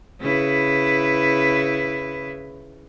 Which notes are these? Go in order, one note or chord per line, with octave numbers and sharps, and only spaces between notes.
C#3 E4 B4